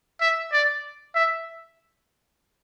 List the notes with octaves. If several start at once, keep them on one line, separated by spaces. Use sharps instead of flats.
E5
D5
E5